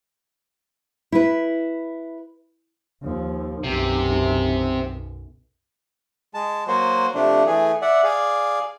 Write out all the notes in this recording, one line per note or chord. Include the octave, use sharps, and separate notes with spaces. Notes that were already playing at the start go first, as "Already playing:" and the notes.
E4 B4
D#2 F3
B1 F#2 C3
G#3 A5
F#3 A#3 F#4 C5
C3 F3 A3 D4
E3 A3 G#4
D5 E5 F#5
G#4 D5 F5